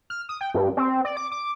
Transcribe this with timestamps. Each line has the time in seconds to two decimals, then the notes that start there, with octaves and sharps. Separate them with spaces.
0.10 F6
0.29 D#6
0.41 G5
0.54 G2
0.77 C4
1.05 D5
1.17 D6
1.32 D6